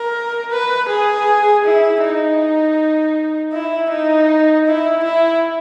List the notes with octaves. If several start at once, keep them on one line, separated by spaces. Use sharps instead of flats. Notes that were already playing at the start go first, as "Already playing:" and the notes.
Already playing: A#4
B4
G#4
E4
D#4
E4
D#4
E4
E4